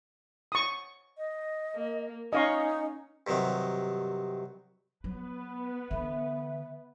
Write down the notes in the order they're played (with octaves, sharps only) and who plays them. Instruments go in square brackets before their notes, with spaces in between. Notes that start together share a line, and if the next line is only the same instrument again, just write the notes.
[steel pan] C#6 D#6
[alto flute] D#5
[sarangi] A#3
[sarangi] C#4 [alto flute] D#4 [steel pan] D#5 F5 C#6
[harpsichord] G2 C3 D#3 F#3
[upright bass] F#3 [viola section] B3 B4
[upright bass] D3 E3 [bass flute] E5